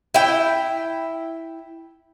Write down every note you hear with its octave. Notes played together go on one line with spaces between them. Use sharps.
E4 G5